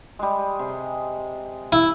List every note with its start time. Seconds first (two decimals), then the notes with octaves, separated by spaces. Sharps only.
0.19 G3 G#3
0.59 C3 G#4
1.72 E4